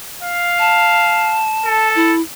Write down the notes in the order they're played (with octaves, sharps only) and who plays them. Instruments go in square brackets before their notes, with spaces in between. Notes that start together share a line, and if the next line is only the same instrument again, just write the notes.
[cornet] F5
[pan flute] A5
[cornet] A4
[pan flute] E4